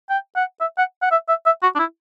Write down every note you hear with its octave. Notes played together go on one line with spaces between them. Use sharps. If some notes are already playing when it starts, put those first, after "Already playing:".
G5
F#5
E5
F#5
F#5
E5
E5
E5
F#4
D4
E4